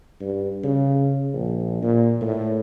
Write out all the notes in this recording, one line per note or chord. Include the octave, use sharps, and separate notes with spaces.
G2
C#3
A#1
A#2
A2